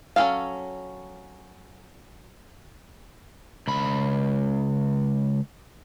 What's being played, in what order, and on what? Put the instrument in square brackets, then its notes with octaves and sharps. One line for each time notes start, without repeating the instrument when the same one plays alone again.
[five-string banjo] F#3 C#4 F4 A4 F5
[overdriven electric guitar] C#2 B5